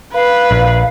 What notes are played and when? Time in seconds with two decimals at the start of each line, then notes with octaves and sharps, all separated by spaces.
0.14 B4 F5
0.51 A#1